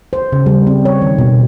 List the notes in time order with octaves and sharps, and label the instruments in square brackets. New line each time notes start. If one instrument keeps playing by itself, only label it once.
[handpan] C5
C#3
G3
C4
C#5
D#3
B2